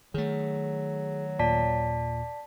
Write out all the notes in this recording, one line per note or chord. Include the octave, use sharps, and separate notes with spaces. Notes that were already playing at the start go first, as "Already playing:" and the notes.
D#3 F#3 A3 G#4
D#2 A#2 D5 A5 B6